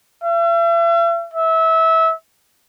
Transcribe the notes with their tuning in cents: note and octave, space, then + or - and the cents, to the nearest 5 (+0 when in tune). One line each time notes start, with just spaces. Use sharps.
E5 +45
E5 -25